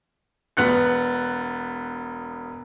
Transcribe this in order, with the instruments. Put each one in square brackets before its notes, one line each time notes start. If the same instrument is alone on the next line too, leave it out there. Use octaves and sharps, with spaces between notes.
[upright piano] E1 B3 F#6 C#7